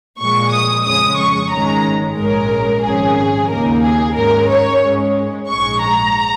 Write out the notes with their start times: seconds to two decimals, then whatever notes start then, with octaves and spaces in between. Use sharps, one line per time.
0.19 A#2 F3 G#3 C#6
0.52 D#6
0.85 F2 C#3 G#3 C#4 D#6
1.18 C#6
1.51 G#1 G#2 D#3 G#3 C#4 A#5
2.17 A#1 G#2 G#3 C#4 A#4
2.84 G#1 G#2 F3 C#4 G#4
3.49 D#2 C#3 A#3 D#4 A#4
3.83 G#4
4.15 G#2 G#3 C#4 A#4
4.49 C#5
4.82 G#2 G#3 C#4
5.48 A#1 G#2 G#3 C#6
5.81 A#5